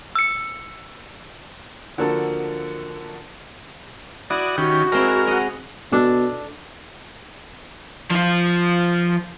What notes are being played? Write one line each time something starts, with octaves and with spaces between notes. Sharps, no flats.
E6 C#7
D3 F3 A#3 F#4 A4
E4 F#4 D5 D#6
D#3 C#4 F#4 G4
G#3 C4 E4 A#4 F6
D#5 F#5
B2 D4 A4
F3 F4